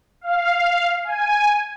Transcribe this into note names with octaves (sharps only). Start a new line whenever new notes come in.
F5
G#5